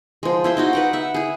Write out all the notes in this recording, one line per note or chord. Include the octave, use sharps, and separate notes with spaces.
F3 G#3
E4 F4 C5
D#4 F4 F#4
B4 F#5 G5
E5 F#5
E4 G#4